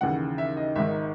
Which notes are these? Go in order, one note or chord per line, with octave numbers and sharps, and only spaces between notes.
D#2 C#3 E3 F#5
E5
D#5
G#1 G#2 D#3 E5